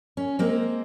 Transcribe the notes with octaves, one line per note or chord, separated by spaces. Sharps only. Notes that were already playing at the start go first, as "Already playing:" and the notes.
C#4
G#3 A#3 C4